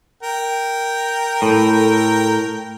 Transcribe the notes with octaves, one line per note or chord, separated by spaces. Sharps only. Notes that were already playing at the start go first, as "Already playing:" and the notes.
A#4 G5
A2 A4